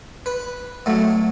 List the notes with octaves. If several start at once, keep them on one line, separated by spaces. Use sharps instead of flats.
B4
A2 F#3 A3